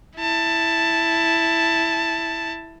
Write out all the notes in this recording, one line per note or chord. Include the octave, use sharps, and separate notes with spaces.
E4 A5